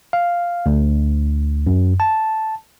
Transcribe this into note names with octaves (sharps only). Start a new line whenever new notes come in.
F5
D2
F#2
A5